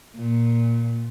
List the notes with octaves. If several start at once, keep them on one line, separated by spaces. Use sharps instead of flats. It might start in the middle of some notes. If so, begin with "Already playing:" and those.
A#2